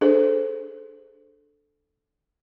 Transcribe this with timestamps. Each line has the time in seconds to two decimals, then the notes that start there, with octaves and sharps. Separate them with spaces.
0.01 D4 G#4 A4 C5